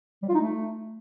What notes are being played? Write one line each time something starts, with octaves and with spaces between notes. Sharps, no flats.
G3
F4
D#4
A3